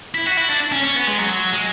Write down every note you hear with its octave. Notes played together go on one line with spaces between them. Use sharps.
E4
F#4
E4
D4
C#4
C#4
B3
G#3
F#3
G#3